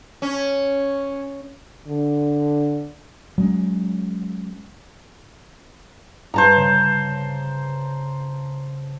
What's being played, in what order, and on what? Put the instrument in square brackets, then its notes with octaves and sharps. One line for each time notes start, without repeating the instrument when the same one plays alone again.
[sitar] C#4
[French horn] D3
[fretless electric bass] F#3 G#3 C#4
[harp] G2 [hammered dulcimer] C5 A5 A#5
[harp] C#3